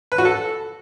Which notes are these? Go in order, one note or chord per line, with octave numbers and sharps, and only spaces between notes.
B4
F#4
A4